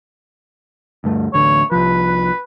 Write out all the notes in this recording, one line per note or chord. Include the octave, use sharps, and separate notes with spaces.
D2 G2 A3
A1 D2 D3 C#5
C2 F3 B4